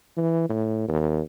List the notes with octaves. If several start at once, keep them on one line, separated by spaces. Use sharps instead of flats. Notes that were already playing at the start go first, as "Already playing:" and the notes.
E3
A2
D#2